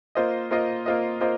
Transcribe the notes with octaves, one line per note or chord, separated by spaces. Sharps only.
A#3 F4 C5 D#5
A#3 F4 C5 D#5
A#3 F4 C5 D#5
A#3 F4 C5 D#5